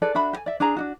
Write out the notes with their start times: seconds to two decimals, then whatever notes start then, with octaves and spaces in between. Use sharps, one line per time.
0.02 G#4 A4 B4 D5
0.15 D4 F#4 E5 B5
0.33 G4 G#5
0.46 D5 E5
0.60 D4 G#4 G#5 A#5
0.76 D4 D#4 F#4